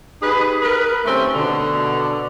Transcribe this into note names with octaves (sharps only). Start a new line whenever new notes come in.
D#4 G4 G#4 B4
A#4 B4
D#3 G3 A3 C4 C#4
B2 D3